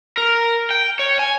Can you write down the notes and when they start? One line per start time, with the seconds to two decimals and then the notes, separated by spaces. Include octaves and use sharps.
0.17 A#4
0.71 G5
0.99 C#5
1.19 G#5